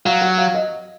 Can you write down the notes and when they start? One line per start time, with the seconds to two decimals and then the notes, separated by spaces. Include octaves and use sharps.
0.05 F#3 F5
0.22 F#5
0.38 F5
0.54 D#5